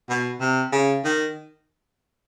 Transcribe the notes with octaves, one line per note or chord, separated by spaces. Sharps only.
B2
C3
C#3
D#3